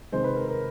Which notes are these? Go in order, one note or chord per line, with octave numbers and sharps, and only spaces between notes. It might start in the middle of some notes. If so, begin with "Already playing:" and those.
C3 D#3 G#3 C5
B4
A#4
A#4